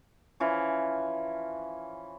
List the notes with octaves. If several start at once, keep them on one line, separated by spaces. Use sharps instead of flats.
E3 F3 C#4